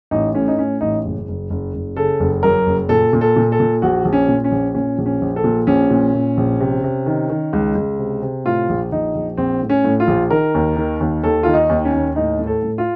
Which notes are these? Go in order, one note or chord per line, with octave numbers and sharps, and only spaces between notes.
A1 D#4
A2 C#4
D#4
A2 C#4
A1 D#4
F#1
F#1
F#1
F#1
C#3 A4
F#1
F#2 A#4
F#1
A#2 A4
A#2
A4
A#2
A4
A#2
A#1 F#4
A#1
C#4
A#2
C#4
A#1
A#2 C#4
A#1
C#4
A#1
A4
A#2
A#1 C#4
A#2
A#2
A#1
C3
C3
D#3
D#3
C#2
C#2
C3
C3
A2 F4
A#1
A#1 D#4
A#1
A#1 C4
A2
C#4
A2
F4
A#1
D#3 A#4
D#2
D#3
D#2
D#2 A4
D#3 F4
D#4
D#2
C#4
D#2
A2 D#4
A2
A4
A2
F4